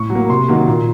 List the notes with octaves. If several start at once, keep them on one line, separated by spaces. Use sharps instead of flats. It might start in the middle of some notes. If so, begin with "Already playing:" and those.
Already playing: A2 C#6
F#3
A#3
C3 C6
D#3 F#3 A#3
A#2